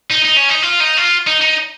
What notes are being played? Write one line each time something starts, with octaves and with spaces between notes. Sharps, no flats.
D#4
D#4
C#4
D#4
F4
D#4
F4
D#4
D#4